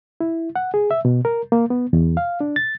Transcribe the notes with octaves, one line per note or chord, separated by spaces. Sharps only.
E4
F#5
G#4
E5
B2
A#4
A#3
B3
E2
F5
D4
A6